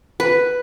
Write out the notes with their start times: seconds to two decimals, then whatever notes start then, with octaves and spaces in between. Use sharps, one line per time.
0.20 B4